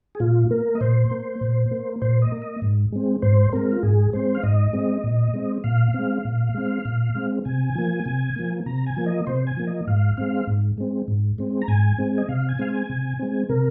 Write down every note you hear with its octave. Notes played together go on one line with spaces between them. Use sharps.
G#4
A#2 F4
A#3 A#4
D#5
A#2 C5
A#3
A#2
A#3
A#2 C5
D#5
A#3
D#5
G#2
G#3 C4
G#2 C5
G#3 C4 A#4
F4
G#2 G#4
G#3 C4 C5
F5
G#2 D#5
G#3 C4
A#2
G#3 C4
A#2 F5
G#3 C4
A#2
G#3 C4
A#2
G#3 C4
C3 G#5
F3 A#3
C3
F3 A#3
C3 A#5
G#5
F3 A#3
D#5
C3 C5
G#5
F3 A#3
D#5
G#2 F5
G#3 C4 F5
G#2
G#3 C4
G#2
G#3 C4
A#5
G#2 G#5
G#3 C4
D#5
C3 F5
G#5
G#3 C4 F5
G#5
C3
G#3 C4
C3 A#4